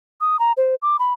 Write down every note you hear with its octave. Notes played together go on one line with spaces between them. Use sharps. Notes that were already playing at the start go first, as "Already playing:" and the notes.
D#6
A#5
C5
D6
B5